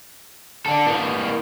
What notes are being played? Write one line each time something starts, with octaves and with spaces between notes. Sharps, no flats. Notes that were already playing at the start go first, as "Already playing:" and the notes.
D4 A4
E3 A#3